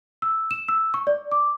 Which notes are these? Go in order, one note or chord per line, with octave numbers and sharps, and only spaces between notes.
E6
E7
E6
C#6
D5
D6